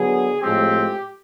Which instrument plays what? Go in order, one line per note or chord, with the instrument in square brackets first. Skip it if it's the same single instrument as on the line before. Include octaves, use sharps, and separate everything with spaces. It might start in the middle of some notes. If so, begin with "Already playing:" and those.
Already playing: [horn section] D3 F#3 B3 G#4
A2 F3 G#3 C4 G4